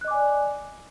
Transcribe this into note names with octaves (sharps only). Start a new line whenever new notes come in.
D5 D#5 G#5 D6 F#6